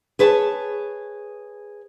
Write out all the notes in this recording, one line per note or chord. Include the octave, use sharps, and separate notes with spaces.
G#4 B4 C#5 A5